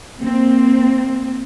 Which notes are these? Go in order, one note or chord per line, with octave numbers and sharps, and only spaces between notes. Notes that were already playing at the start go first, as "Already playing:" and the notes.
A#3 C4